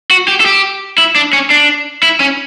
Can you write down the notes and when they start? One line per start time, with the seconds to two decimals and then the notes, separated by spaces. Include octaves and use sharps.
0.11 F#4
0.28 G4
0.40 A4
0.46 G4
0.98 E4
1.16 D4
1.33 C#4
1.50 D4
2.03 E4
2.20 C#4